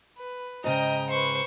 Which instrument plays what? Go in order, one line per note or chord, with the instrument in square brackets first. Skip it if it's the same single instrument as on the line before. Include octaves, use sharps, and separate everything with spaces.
[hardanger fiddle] B4
[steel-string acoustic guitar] G#2 C#3 [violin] D#5 [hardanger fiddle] G5 A#5
[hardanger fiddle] B4 C5 [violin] C#6